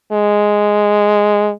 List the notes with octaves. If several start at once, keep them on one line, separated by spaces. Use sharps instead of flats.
G#3